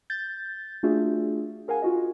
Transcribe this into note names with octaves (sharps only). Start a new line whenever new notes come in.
G6 A6
A3 D4 F4 F#4 G#4 E5
G#4 A#4 F5 F#5 G#5
F4 F#4 D#5